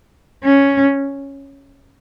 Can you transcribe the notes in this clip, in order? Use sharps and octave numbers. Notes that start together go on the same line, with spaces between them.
C#4